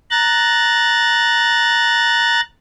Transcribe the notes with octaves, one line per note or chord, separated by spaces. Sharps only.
A#5 F#6 A6